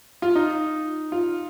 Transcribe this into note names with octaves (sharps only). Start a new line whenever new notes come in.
F4
D#4
F4